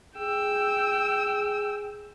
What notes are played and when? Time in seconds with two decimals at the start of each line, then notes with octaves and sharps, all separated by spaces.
0.17 G#4 G5 E6